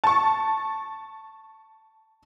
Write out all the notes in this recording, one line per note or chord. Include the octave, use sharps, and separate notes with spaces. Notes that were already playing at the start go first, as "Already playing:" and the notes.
A5 C#6